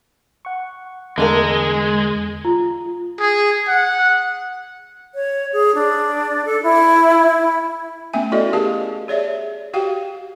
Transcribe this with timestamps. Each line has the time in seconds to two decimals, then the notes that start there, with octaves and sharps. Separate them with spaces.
0.45 F#5 C#6
1.18 E2 D3 G#3 A3 A4 A#4
2.45 F4
3.20 G#4
3.67 F#5
5.15 C#5
5.53 G#4
5.75 D4
6.45 A4
6.63 E4
7.27 E4
8.13 A3 B3 C#4 E5 G#5
8.32 E4 F#4 A4 D5 D#5
8.53 G4 G#4 A#4 F5 A5
9.08 G#4 C#5 D5 E5
9.73 F#4 G4 F5 G5